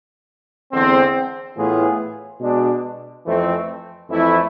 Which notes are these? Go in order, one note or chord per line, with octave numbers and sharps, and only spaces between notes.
E2 D3 G#3 C4
A2 E3 B3 F4 G#4
B2 G#3 D4
F2 E3 A3 C4
F2 E3 A3 E4